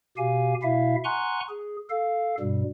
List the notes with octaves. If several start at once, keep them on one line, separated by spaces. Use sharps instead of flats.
B2 G4 F5 G#5
B2 E4 E5 F5
F#5 G#5 A#5 C6 C#6 F#6
G#4
A4 F5
G2 B2 G3